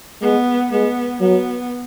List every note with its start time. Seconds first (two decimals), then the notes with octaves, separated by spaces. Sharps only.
0.22 G#3 B3
0.71 G#3 B3
1.20 F#3 B3